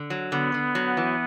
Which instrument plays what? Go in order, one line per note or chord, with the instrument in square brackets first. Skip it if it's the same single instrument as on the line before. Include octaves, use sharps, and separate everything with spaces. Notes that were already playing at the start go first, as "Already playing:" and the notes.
Already playing: [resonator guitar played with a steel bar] D3
F#3
[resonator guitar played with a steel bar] D3 [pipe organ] B3
[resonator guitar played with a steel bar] D3
F#3
E3